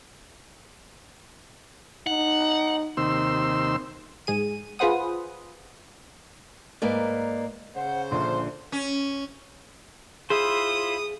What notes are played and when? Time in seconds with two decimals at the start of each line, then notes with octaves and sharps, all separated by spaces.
2.07 D#4 F#5
2.97 D#2 C3 C6 E6
4.27 G#2 G#4 D#7
4.79 F4 G#4 B4 C5 F#5 D#6
6.82 G#2 A#3 B4 D5
7.76 C#3 C5 F#5
8.11 A#1 A#2 D3 C6
8.72 C#4
10.30 E4 F4 G#4 C5 D#6